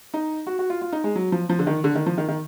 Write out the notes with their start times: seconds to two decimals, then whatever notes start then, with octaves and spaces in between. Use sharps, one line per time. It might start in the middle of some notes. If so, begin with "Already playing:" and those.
0.14 D#4
0.47 F#4
0.59 F#4
0.70 F4
0.81 F4
0.92 D#4
1.04 G#3
1.16 F#3
1.32 F3
1.49 F3
1.59 D3
1.67 D#3
1.84 D3
1.95 D#3
2.06 F3
2.18 D#3
2.28 D#3